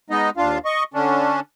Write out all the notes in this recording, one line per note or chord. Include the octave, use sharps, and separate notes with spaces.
G#3 B3 D#4 D#5
D#2 D4 F4 F5
D#5 C#6
D3 C#4 D4